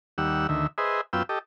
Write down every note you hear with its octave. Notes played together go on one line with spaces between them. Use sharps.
D#2 G3 F#5 E6
D2 D#3 E5
G#4 B4 C5 D#5 E5
F#2 B3 F4 G5 E6
G4 A4 D#5